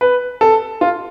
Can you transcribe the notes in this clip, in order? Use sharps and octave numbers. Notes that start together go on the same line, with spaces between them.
B4
A4
F4